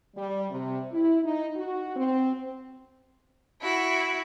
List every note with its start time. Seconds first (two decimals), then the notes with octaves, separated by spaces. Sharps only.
0.16 G3
0.51 C3
0.92 E4
1.24 D#4
1.57 F#4
1.96 C4
3.62 E4 F#4